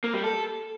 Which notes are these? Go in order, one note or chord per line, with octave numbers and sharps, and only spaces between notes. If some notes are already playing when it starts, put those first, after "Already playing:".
A#3
G3
A4